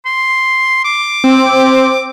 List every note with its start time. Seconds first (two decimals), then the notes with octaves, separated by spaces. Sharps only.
0.06 C6
0.84 D6
1.24 C4